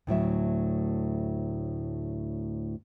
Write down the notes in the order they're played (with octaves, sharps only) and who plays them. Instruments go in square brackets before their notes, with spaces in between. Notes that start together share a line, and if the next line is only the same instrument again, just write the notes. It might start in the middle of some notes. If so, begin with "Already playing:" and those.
[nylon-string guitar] D2 A2 F#3 E5